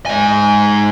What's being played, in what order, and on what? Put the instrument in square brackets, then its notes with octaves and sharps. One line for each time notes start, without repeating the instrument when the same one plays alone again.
[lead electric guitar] G#2 G#5